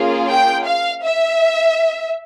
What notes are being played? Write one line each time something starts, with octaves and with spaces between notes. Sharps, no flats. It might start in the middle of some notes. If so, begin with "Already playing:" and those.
Already playing: A#3 C#4 F4 G#4
G5
F5
E5